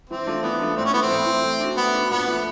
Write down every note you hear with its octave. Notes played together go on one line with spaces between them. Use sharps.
E3 C4
A3 D4 F4 A4
E3 B3
A3 D4 F4 A4
A2 C4
C#4
E3 A3 B3
C4
A2
E3 A3
A3
D4 F#4
A3 B3
D4 F#4
A#2 B3
F3 A3 D4